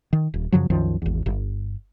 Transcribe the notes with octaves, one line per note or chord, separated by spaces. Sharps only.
D#3
D#1
F#2 C#3 F3 F#3
C2 F#2 D#3 F3
G#1 E2
G1